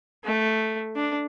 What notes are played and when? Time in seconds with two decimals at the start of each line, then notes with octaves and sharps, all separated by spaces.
0.25 A3
0.96 D4